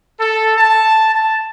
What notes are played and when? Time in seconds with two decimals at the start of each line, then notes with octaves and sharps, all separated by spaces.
0.20 A4
0.57 A5
1.13 A5